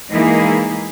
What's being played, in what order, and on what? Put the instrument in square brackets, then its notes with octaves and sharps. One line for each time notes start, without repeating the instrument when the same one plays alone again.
[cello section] E3 G#3 A#3 D#4 E4 G#4